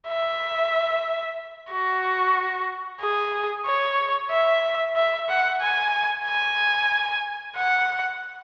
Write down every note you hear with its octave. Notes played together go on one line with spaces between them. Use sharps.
E5
F#4
G#4
C#5
E5
E5
F#5
G#5
G#5
F#5